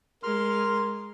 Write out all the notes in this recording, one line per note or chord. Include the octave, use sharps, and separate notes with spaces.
G#3 A#4 C6 F6